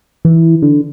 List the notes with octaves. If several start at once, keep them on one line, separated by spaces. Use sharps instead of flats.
E3
D3